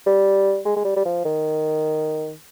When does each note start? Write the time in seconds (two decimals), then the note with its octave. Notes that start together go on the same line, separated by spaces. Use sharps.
0.06 G3
0.65 G#3
0.76 G#3
0.85 G3
0.96 G3
1.05 F3
1.25 D#3